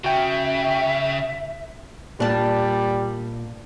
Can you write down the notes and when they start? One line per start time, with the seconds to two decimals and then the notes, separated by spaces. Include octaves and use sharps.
0.04 C#3 F#4 E5 G5
2.20 A#2 G3 D4 A5